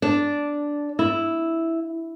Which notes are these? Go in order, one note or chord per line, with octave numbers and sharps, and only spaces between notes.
D4
E4